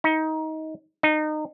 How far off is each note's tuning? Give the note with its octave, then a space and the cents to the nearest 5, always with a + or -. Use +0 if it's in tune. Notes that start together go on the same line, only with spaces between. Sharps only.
D#4 +20
D#4 -25